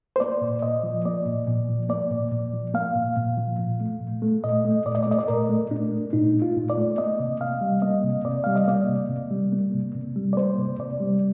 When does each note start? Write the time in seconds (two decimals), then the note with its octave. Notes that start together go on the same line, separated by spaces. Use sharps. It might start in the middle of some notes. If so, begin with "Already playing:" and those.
0.16 C5
0.20 A#3 D5
0.41 A#2
0.62 A#2 D#5
0.83 F3
1.05 A#3 D5
1.26 A#2
1.47 A#2
1.68 F3
1.89 A#3 D5
2.10 A#2
2.32 A#2
2.53 F3
2.74 A#3 F5
2.95 A#2
3.17 A#2
3.38 F3
3.59 A#2
3.80 A3
4.01 A#2
4.22 A3
4.44 A#2 D#5
4.65 A3
4.86 A#2 D5
4.95 D#5
5.03 D5
5.07 A3 D#5
5.19 D5
5.28 A#2 A#4
5.49 A3
5.71 A#2 D4
5.92 A3
6.13 A#2 D#4
6.35 A3
6.42 F4
6.56 A#2
6.70 D5
6.77 A3
6.98 A#3 D#5
7.20 C3
7.41 C3 F5
7.61 G3
7.82 A#3 D#5
8.04 C3
8.25 C3 D5
8.44 G3 F5
8.56 D#5
8.67 A#3 D5
8.89 C3
9.09 C3
9.31 G3
9.52 A#3
9.74 C3
9.95 C3
10.16 G3
10.33 D5
10.37 A#3 C5
10.58 C3
10.79 C3 D5
11.00 G3